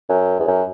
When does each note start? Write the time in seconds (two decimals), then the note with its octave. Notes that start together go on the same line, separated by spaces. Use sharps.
0.09 F#2
0.39 E2
0.48 F#2